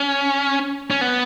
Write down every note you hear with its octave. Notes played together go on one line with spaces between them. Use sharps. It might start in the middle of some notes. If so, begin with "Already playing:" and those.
Already playing: C#4
C#4
B3